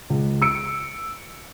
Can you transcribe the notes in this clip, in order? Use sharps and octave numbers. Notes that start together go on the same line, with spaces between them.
C#2
E6 C#7 D7